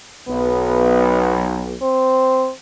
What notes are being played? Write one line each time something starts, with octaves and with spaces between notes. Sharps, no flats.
B1 B3
C4